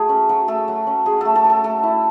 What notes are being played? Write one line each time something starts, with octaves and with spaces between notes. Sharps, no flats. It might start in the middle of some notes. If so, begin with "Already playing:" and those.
Already playing: F#3 A3 G#4
C#4
F#3
A3 A4
F#3
C#4
F#3 G#4
A3 A4
A4
F#3
A4
A3 A4
E4